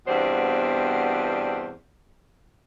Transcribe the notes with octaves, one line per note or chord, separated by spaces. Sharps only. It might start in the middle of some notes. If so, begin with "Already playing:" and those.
E2 G2 B2 C4 C5 D5